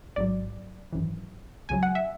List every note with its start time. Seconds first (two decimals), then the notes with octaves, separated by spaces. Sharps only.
0.16 A1 G#2 F#3 D5
0.93 G#1 F#2 E3
1.69 C#2 C#3 F#3 G#5
1.83 F#5
1.95 E5